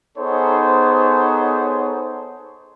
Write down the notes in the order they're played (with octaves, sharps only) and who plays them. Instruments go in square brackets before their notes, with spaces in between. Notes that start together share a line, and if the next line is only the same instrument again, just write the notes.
[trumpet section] B3 D#4 G#4 A4 C5 C#5